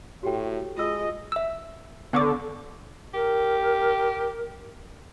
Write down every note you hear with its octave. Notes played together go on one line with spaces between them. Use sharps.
A2 F#4 G4 G5
G#3 F4 D#5 E6
E5 E6
D3 B3 C#6 D6
G4 A#4